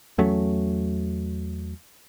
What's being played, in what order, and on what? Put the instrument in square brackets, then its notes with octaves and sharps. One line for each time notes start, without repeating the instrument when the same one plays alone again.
[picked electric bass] E2 F#3 A3 C#4